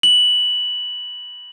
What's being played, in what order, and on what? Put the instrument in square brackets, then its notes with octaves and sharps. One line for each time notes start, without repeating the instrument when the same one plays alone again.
[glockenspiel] F#7